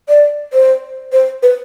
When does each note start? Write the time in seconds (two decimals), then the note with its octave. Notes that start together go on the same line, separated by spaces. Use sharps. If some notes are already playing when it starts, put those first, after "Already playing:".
0.09 D5
0.53 C5
1.12 C5
1.43 B4